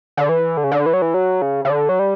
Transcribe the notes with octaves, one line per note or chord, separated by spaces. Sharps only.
D3
E3
D3
C#3
D3
E3
F#3
E3
F#3
C#3
C#3
D3
F#3
G3